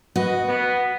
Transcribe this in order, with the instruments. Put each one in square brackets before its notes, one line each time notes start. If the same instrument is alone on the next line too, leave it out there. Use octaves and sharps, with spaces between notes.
[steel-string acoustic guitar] F#4 [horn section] B4 D#5
[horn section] B3